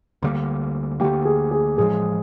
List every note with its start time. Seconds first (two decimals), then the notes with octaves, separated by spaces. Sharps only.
0.23 D2 D3 G3 A#3
1.00 D2 D3 G3 A#3 G4
1.25 G#4
1.51 G#4
1.78 A1 A2 F3 G#3 G#4